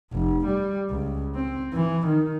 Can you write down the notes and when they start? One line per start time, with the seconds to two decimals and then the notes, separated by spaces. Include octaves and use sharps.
0.13 F1
0.46 G3
0.90 C#2
1.35 C4
1.73 E3
2.07 D#3